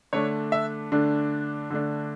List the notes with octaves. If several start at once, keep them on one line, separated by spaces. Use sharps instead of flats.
D3 A3 D4 C#5
E5
D3 A3 D4
D3 A3 D4